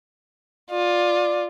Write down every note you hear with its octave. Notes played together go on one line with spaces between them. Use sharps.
F4 D5